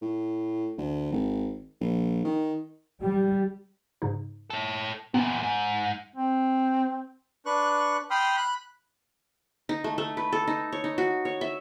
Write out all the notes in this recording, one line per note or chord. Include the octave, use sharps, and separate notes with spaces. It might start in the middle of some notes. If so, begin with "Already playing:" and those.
A2
D2
G#1
A#1
D#3
G3
G#2 C#3 D#4
A4 C#5
E2 A#2 B3
G#2
C4
D4 B4 C#6 F#6
G5 B5 C6 D#6 F6
B5 F#6
D#4
A3
A3
B4
A4
D#4
C#5
D#4
F#4
C#5
E5